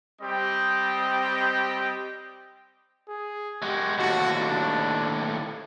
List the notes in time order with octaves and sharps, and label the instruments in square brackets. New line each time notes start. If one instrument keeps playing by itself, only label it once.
[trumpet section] G3 C4 G4 D#5
[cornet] G#4
[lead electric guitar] G#3 F#4 [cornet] G4
[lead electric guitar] D#2 A2 [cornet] F#4
[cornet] D4